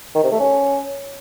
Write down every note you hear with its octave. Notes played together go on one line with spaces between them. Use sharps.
D#3
C3
A3
C#4